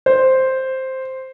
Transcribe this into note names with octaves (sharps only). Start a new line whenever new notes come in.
C5